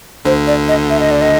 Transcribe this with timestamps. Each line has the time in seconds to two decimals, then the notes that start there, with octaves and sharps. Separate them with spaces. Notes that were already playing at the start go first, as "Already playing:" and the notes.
0.25 D2 D3 C5
0.47 D5
0.68 D#5
0.90 E5
1.00 D#5
1.11 D5
1.21 D#5